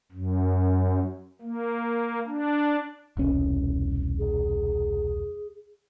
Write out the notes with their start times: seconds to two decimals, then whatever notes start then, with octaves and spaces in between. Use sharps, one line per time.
0.12 F#2
1.42 A#3
2.27 D4
3.17 E1 C2 C#4
4.19 G#4